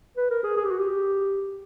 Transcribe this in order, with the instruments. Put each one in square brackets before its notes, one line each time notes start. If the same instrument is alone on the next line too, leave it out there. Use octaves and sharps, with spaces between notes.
[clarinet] B4
A#4
G#4
G#4
G4
F#4
G4